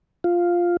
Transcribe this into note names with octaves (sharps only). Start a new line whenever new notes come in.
F4